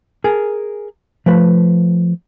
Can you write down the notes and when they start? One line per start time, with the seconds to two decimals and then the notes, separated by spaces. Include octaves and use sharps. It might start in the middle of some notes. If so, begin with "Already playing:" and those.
0.24 G#4 A#4 G#5
1.26 F3 A3 B4